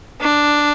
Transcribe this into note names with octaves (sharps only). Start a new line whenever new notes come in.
D4